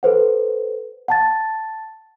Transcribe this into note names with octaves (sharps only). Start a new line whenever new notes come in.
A4 B4 C5 F#5
F#5 A5 A6